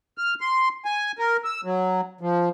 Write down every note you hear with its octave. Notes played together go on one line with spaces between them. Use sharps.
F6
C6
G#5
A#4
E6
F#3
F3